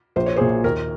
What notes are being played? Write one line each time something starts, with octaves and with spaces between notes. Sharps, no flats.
A#1 C5
C#5
G#4 C5
A#2
D#2 A#4